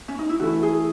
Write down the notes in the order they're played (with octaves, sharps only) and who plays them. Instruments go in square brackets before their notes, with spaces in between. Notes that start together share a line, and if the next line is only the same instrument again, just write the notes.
[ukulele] C#4
D#4
E4
[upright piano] E3 A3 E4 [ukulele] F#4
[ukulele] G#4